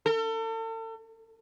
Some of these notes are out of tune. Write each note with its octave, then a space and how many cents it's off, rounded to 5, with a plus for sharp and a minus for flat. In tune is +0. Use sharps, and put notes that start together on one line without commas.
A4 +40